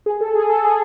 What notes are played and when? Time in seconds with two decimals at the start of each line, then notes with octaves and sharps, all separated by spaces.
0.06 G#4
0.21 A4
0.35 G#4
0.49 A4
0.64 G#4